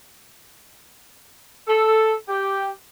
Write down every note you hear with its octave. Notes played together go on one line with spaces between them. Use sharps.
A4
G4